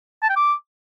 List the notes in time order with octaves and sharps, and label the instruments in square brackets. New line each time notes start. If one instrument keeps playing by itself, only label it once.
[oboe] A5
G5
D6